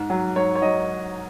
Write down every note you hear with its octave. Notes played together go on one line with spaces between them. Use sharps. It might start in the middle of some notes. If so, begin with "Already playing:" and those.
Already playing: G#2
F#3
G#2 C#5
C#5
F#3 D#5